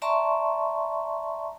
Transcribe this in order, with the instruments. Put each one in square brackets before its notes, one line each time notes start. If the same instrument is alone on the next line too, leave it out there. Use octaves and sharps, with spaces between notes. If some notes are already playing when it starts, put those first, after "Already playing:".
[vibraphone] D5 E5 A5 A#5 C6 C#6